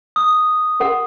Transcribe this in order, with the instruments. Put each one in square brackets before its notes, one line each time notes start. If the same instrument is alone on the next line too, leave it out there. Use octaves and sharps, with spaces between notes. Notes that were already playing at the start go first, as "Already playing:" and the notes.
[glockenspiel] D#6
[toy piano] F#4 A#4 F#5